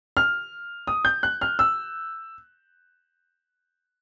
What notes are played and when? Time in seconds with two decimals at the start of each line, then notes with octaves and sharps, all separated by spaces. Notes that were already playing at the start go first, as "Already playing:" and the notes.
0.17 F6
0.87 D#6
1.05 G6
1.23 F#6
1.41 F6
1.59 E6